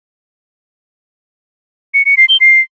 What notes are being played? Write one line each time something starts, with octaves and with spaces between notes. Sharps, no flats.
C#7
C#7
C7
G7
C7